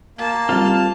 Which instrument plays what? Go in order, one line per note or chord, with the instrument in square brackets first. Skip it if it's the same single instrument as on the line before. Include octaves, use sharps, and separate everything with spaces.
[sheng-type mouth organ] A#3 [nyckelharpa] A5
[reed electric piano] G3 C4 [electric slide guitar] F4 A4 F5